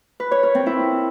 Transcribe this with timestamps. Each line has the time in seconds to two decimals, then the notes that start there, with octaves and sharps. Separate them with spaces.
0.20 B4
0.31 C#5
0.43 A#4
0.55 C4
0.66 E4